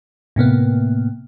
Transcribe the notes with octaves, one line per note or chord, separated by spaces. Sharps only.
A2 C3 A#3 B3